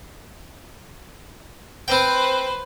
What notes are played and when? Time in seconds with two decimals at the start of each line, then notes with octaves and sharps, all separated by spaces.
1.88 C4 B4 C5 G5